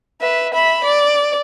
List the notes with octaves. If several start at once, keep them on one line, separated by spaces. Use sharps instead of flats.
B4 E5
E5 B5
D5